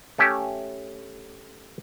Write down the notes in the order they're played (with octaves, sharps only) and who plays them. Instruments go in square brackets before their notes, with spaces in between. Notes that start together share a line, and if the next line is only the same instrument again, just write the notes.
[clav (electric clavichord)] A3 C#4 G4 E5